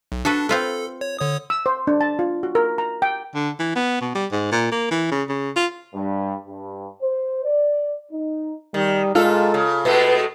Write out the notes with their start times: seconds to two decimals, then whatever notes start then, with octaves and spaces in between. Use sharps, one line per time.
0.12 B1
0.25 D4 F#4 A4 B4
0.49 C4 F4 A4 B4
1.01 C#5
1.19 D3 C#5 D#6
1.50 E6
1.66 C5
1.87 D4
2.01 A5
2.19 F4
2.43 F#4
2.55 A#4
2.78 A#5
3.02 G5
3.35 D3
3.59 E3
3.76 B3
4.01 B2
4.15 G3
4.32 G#2
4.52 A#2
4.72 A#3
4.91 E3
5.12 C#3
5.29 C#3
5.56 F4
5.94 G2
6.47 G2
7.02 C5
7.44 D5
8.12 D#4
8.74 D#3 G3
9.15 A#2 G#3 F4 A4
9.54 C#3
9.85 B2 G#3 A3 B4